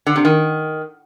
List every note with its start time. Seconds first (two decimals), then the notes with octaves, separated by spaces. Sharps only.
0.07 D3
0.16 C3
0.25 D#3